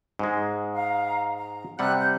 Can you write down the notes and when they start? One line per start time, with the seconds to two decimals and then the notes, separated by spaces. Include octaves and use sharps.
0.19 G#2 G#3
0.74 F5 A#5
1.36 A#5
1.79 C3 G3 G4 F#5 E6 F#6
2.00 G6